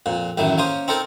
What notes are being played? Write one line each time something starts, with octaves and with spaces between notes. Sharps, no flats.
F2 A#2
A1 F#2 D#3 A3
A#3 C#4 C5 D#6
C4 D#4 A4 A#4